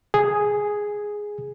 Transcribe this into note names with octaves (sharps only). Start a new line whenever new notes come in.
G#4